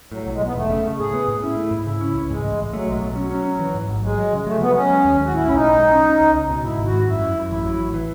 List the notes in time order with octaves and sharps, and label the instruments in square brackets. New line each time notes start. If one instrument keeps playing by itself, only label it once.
[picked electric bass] A2 [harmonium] F#3
[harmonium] F#3
[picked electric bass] B1
[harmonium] G#3
[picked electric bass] B1 [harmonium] B3
[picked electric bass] E1 [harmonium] A3
[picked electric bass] C#3
C#3
[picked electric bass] A2 [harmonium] G#4
[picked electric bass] B3
A2
[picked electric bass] C#4 [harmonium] E4
[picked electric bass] A3
G#2
[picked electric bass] C#3 [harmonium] E4
[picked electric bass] C#4
C#2
[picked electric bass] G#2 [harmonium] G#3
[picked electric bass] A1
A1
[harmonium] F#3 [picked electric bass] A3
[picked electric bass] B1 [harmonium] G#3
[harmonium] F#3
[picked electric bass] B2
[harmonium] F#3 [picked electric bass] C#4
[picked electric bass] C#4
C#4
E3
G#2
A1
[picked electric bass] F#3 [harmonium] G#3
[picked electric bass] F#3
C#3
[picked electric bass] F#3 [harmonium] A3
[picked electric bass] F#3 [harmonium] B3
[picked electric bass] F#3 [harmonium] C#4
[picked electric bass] G#3
D#2
D#2
[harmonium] F#4
[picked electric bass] A2 [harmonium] E4
[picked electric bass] B1 [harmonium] C#4
[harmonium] D#4
[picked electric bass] B1
G#3
C#4
C#4
C#2
C#2
B2
[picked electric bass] G#2 [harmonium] E4
[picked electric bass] G#1
[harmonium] F#4
[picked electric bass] G#2
[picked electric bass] F#2 [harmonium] E4
[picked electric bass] F#2
F#2
[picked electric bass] A1 [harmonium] E4
[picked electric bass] F#3
A1
E3